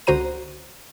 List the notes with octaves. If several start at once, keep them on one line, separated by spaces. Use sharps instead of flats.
C#2 D3 F#4 C5 A#5 D#7